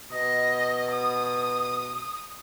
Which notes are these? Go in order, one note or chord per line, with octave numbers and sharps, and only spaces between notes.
B2 D#5
D#6